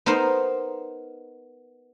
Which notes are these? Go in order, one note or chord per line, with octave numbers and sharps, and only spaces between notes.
B3 D#4 A#4 C5